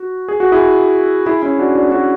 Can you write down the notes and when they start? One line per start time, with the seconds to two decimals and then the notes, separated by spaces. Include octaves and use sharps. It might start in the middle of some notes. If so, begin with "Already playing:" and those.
Already playing: F#4
0.28 G#4
0.40 F#4
0.52 E4 G#4
1.26 E4 G#4
1.42 C#4 E4
1.59 D4 F#4
1.75 D4 F#4
1.91 D4 F#4